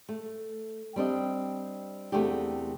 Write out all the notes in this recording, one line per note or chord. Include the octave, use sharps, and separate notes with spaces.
A3
G3 C4 D4 D#5
E2 C3 A3 A#3 D4 G4